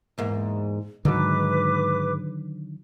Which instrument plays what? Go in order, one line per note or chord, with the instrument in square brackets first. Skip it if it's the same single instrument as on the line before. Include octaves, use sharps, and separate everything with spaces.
[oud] E2 G#2 A#3
[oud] G#2 [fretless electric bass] D3 D#3 F#3 [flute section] B4 D6